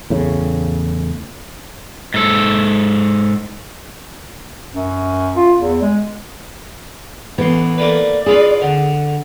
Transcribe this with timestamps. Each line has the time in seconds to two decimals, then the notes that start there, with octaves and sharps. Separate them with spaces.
0.10 E2 A2 C#3
2.14 G#2 A4
4.73 F#2
5.37 F4
5.60 E2
5.82 G#3
7.38 A1 E3 B3 C6
7.78 A3 A#3 B4 D5
8.26 E4 F4 G#4 B4
8.61 D3 F#5